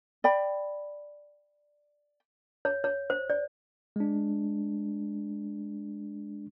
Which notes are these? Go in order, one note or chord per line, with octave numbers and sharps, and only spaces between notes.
D5 G5 B5
C#5
C#5
C5
D5
G#3 D4